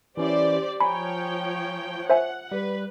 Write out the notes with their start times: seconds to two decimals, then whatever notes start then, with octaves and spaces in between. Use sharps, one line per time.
0.17 E3 C#4 E4 G4 C5 D5
0.80 F3 C#5 G5 G#5 A#5 B5
2.10 C5 E5 F#5 G#5
2.52 G3 B4